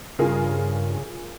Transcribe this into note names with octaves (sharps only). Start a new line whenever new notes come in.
G2 C#3 F4 G#4 A#4